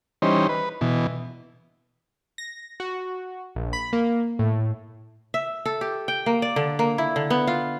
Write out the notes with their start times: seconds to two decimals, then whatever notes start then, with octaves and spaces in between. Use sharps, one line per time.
0.22 E3 G3 C#4 D#4 C5
0.49 B4
0.81 B2 E3
2.38 A#6
2.80 F#4
3.55 A#1
3.73 B5
3.93 A#3
4.39 A2
5.34 E5
5.65 A4
5.81 G4
6.08 G5
6.26 A#3
6.42 D5
6.56 D3
6.79 A#3
6.98 E4
7.16 D3
7.30 B3
7.47 F4